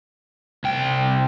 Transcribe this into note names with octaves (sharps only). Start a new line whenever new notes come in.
C2 G5